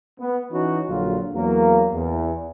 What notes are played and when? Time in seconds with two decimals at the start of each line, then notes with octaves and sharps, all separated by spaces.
0.20 B3
0.52 E3 C#4 D#4 F#4
0.89 A#1 D3 F#3 F4
1.35 E2 F#3 A#3
1.93 E2